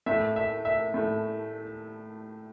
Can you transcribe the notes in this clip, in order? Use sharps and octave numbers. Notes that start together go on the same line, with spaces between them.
A2 A3 E5
E5
E5
A2 A3